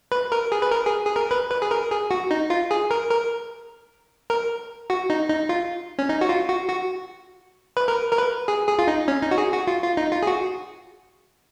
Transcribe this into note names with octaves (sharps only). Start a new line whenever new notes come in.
B4
A#4
G#4
B4
A#4
G#4
G#4
A#4
B4
B4
G#4
A#4
G#4
F#4
D#4
F4
G#4
A#4
A#4
A#4
F#4
D#4
D#4
F4
C#4
D#4
F#4
F4
F#4
F#4
B4
A#4
A#4
B4
G#4
G#4
F4
D#4
C#4
D#4
F#4
G#4
F#4
F4
F4
D#4
F4
G#4
F#4